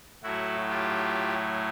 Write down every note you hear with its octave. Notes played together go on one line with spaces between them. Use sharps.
A2 F#3 A3 E4 F#4
F4 G4